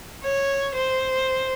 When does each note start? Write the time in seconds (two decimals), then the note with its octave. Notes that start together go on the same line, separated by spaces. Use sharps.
0.23 C#5
0.75 C5